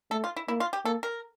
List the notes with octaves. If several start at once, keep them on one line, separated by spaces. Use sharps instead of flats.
A3 A4
F4
E4
A#3 E4
F4
G4
A#3 A4
A#4